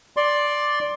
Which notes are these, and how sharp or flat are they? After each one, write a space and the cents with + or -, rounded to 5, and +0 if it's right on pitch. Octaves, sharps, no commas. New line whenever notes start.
D5 +0 C6 +15